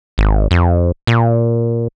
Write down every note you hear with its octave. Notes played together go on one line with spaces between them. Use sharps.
G#1
F2
A#2